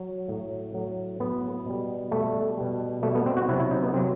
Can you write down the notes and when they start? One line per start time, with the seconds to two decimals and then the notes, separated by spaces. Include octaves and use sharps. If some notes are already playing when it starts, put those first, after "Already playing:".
Already playing: F#3
0.28 A2 F#3
0.74 A2 F#3
1.20 A2 F#3 B3
1.66 B2 G3
2.11 B2 G3 A3
2.57 B2 G3
3.02 B2 G3 A3
3.15 B3
3.26 C4
3.37 F#4
3.48 C3 E4
3.51 F#3
3.59 E4
3.71 D#4
3.83 B3
3.94 C3 F#3 C4